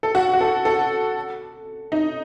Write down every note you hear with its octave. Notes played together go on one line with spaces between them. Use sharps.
A4
F#4
F#4
A4
A4
D#4